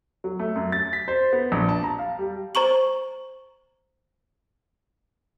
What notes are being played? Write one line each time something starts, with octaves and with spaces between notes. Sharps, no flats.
F#3
A3
F#2
A6
B6
C5
B3
A#1
A5
A#5
F5
G3
C5 A#5 C#6 F#7